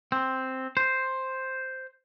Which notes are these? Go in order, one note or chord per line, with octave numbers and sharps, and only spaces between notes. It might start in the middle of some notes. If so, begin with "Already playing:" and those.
C4
C5